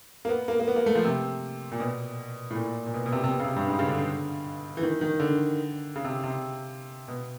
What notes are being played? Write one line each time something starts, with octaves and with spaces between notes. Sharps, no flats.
A#3
B3
A#3
A#3
B3
A#3
A3
F3
C3
A#2
B2
A2
A#2
A#2
B2
B2
C3
C3
B2
C#3
C3
G2
G#2
C#3
D3
E3
D#3
D#3
D3
C#3
C3
C3
B2